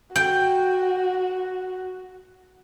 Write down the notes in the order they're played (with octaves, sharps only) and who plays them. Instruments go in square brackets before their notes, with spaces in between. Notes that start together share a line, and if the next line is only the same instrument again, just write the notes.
[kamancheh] F#4 [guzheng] G5